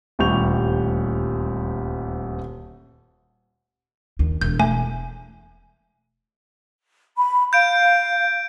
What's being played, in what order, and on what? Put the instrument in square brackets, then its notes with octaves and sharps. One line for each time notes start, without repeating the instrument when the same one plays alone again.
[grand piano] D#1 D2 G3 C#6 G6 F7
[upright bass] D#2
[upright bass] E1 [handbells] G6
[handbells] A3 G#5
[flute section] B5
[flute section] F5 [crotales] G6 D7